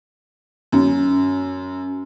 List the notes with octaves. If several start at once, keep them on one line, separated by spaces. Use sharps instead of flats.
F#2